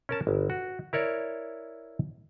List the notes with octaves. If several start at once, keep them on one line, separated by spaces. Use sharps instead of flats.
C#4 A#4 A5
G1
F#4
E4 A#4 C#5 D5